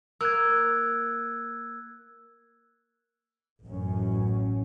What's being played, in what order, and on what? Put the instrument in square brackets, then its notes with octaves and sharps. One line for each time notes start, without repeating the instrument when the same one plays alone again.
[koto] A#3 [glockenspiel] E6 F#6 G#6
[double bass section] A1 F#2 A2 C#4